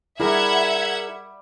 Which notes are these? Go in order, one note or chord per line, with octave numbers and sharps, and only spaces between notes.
G3 E4 G#4 A#4 E5 F#5 G#6